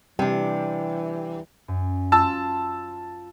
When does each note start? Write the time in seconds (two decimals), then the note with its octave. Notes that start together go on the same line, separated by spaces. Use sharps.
0.19 C3 E3 G3 D4 G5
1.68 F#2
2.12 F4 A5 E6